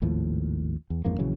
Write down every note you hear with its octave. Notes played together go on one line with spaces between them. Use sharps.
G#1 D#2 A2 F3
E2
A1 F2 G#2 A#3
A#1 C#3 E3 F#3